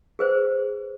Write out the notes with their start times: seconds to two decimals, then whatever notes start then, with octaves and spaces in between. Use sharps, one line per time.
0.19 G#4 B4 C5